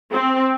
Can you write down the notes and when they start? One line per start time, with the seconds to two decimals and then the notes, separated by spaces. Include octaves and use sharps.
0.12 C4